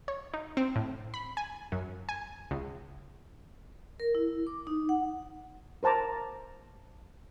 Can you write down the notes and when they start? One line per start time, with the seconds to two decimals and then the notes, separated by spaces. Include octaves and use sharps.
0.08 C#5
0.34 D#4
0.57 C4
0.76 A2
1.14 B5
1.37 G#5
1.72 F#2
2.09 G#5
2.51 C#2
4.00 A#4
4.15 E4
4.47 D6
4.67 D#4
4.89 F#5
5.83 A#4 C5 A5 A#5 D6